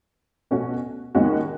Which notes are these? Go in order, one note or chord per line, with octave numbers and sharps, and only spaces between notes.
B2 A3 C#4 F#4
D#2 D#3 G#3 C#4 F#4